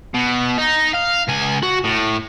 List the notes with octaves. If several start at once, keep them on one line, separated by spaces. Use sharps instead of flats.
B2
D#4
F5
C#2 G#5
F#4
A2